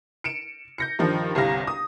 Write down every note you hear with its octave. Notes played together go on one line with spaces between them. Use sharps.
C#7 D7 E7
G6 A#6 C#7
G2 D#3 F3
G1 C2 C3 F5 A#6
D#6